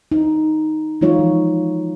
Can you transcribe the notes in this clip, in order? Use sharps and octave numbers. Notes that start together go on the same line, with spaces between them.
D#4
E3 F#3 G#3 D#4 F4 C#5
F3